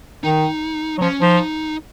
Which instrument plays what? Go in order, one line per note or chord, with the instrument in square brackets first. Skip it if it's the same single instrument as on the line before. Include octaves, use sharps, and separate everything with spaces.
[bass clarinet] D#3 [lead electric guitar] D#4
[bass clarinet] F#3
[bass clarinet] F3 [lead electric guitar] C#4
[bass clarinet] F3 [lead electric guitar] D#4